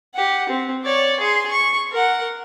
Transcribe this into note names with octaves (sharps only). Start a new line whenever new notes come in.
G4 F#5
C4
C#5 D5
G#4 C6
C#6
A#4 F#5